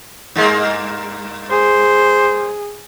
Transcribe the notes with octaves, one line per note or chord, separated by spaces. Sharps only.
G2 G#3 A#3
G#4 C5